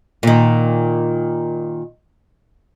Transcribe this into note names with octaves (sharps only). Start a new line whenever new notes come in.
A#2 D#3